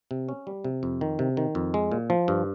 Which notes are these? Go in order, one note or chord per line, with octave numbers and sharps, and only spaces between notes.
C3
C#4
G3
C3
F2
D#3
C3
D#3
F2
G#3
A#2
F3
G2